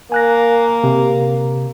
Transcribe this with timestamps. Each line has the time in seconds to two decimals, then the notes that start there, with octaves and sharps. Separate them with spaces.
0.12 A#3 G#5 F#6 A#6
0.84 C3